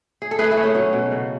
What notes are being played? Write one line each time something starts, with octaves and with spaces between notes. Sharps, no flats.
G#4
A4
A3 G#4 B4
E4 G#4
A3
C#4
F#3 C#4
B2
C#3